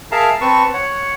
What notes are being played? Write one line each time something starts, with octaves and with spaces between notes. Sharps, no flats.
G#4 A#4 E5 F5 A5 A#5
C4 B4 A5 C#6
C#5 F#5